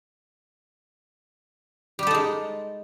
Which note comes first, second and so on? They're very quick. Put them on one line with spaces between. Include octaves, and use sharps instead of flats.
G3 G4 A4 D#4 G#3